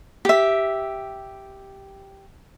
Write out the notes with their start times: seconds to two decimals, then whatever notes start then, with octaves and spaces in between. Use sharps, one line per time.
0.25 G4 E5